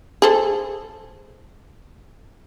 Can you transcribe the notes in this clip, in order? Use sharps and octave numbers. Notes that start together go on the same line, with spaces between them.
G#4 A4 C5